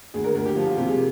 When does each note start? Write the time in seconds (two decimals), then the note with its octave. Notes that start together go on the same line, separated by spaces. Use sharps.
0.14 D2 G#4
0.24 A#4
0.35 D2 A#4
0.46 G4
0.56 F3 F4
0.67 F4
0.77 C3 G4
0.88 G#4